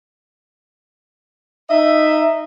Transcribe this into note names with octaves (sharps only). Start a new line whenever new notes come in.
D#4 D#5 E5